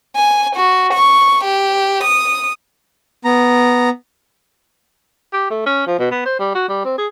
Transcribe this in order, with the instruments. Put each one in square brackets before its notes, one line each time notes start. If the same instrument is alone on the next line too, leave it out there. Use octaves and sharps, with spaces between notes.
[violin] G#5
F#4
C#6
G4
D#6
[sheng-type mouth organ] B3 A#5
[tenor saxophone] G4
A3
C#4
F3
B2
B3
C5
G3
F#4
G3
C4
G#4